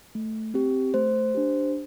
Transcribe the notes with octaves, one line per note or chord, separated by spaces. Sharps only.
A3
C4 G4
A3 C5
D4 G4